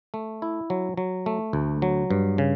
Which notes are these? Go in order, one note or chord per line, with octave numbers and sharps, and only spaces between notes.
A3
E4
F#3
F#3
A3
D2
F#3
G2
C#3